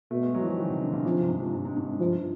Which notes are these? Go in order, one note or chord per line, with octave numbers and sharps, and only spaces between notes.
B2 A3
G#3
F#3
E3
F3
D#3
C3
D3
C#3
C3 F3
G2
G#2
G2
G#2
G#2
G#2
G2
G2 F3